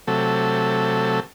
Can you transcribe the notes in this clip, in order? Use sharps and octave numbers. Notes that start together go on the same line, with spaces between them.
C3 F#3 A3 A4